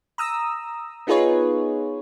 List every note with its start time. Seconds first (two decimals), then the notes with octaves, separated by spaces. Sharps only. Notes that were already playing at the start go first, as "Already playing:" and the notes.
0.18 A#5 D#6 E6
1.07 B3 D#4 F4 G#4 B4 C#5